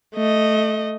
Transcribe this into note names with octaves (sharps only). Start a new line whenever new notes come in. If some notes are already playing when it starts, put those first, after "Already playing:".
A3 D#5